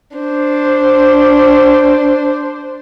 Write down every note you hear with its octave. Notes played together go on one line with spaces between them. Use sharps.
D4 C5